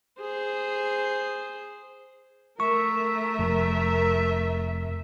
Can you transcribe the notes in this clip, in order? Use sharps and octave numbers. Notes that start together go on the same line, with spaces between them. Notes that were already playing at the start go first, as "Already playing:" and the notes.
G#4 C5
A3 A#4 E5 C#6
F1